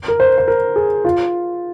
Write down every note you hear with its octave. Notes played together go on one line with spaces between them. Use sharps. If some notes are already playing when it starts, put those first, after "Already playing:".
A#4
C5
C5
A#4
G#4
F4